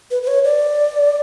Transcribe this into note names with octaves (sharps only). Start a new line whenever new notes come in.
B4
B4
C#5
D5